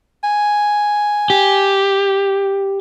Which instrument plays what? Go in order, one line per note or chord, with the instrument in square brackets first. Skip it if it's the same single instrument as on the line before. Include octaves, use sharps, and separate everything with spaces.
[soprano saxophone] G#5
[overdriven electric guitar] G4